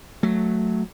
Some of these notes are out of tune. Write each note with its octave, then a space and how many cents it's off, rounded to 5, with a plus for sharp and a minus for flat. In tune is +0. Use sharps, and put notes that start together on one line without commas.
F#3 +0 A3 +0